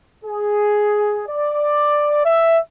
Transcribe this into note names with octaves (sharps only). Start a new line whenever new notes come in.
G#4
D5
E5